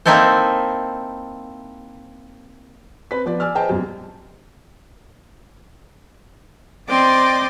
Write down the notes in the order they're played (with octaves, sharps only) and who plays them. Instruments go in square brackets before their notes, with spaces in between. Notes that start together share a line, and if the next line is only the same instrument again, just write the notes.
[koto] A#3 C4 D#4 E4 A4 C5
[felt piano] C4 B4 B6
F3 B3 D5
D5 G#5 E6 F6
G#4 B4 C5 D#5 G5 A5
E1 C2 F#2
[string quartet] C4 D5 D#5 G5 C6 D6